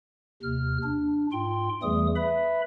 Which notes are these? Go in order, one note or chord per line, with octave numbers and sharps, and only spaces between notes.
D#2 C3 F6
D4
G#2 F4 G5 C6
E2 E3 G3 A3 G#4 D#6
B4 E5 B5